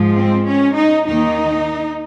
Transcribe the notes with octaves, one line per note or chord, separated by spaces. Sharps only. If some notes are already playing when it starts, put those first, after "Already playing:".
Already playing: G#2 F3 G#3
C4
C#4
D#4
D#2 D#3 A#3 D#4